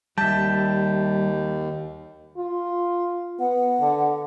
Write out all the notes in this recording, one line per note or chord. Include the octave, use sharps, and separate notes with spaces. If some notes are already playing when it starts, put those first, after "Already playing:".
D#2 G3 E5 A5 G6
F4
B3 F#5
D3